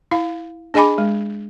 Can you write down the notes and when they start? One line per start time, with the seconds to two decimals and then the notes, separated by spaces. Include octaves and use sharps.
0.11 E4 F5
0.74 D4 G#4 D#5 G#5 B5 D6
0.98 G#3